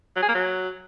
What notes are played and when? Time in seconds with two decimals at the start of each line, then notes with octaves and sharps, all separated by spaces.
0.16 F#3
0.22 G#4
0.29 A#3
0.35 F#3